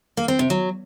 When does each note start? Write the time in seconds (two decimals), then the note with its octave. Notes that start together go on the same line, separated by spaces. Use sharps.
0.17 A#3
0.28 C4
0.39 C3
0.50 F#3